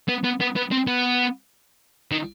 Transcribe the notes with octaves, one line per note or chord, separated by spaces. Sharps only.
B3
B3
B3
B3
C4
B3
D#3